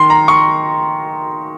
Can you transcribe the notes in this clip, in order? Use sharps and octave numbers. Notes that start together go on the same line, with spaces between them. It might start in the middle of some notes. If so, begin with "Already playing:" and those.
Already playing: D#3 C6
A#5
C#6